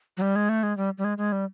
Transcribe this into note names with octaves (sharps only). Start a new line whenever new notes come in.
F#3
G3
G#3
A3
G#3
G3
G3
G#3
G#3
G3